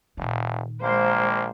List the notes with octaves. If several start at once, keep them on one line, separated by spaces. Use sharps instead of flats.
F1 A#2 D#3
A#1 G#3 A#3 C5